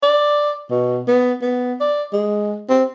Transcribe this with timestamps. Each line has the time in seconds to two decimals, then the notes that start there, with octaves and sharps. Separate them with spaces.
0.03 D5
0.70 B2
1.08 B3
1.42 B3
1.81 D5
2.13 G#3
2.69 C4